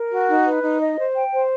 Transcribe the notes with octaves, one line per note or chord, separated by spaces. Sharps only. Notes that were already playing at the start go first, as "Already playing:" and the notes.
Already playing: A#4
F#4
D#4
B4
D#4
D#5
C5
G5
C5